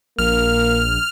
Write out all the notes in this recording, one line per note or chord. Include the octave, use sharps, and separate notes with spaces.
A#1 A#3 F6